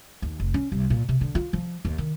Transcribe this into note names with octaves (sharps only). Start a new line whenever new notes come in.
D#2
F1
C#4
C2
A#2
C3
D3
F4
F3
D#2
D#3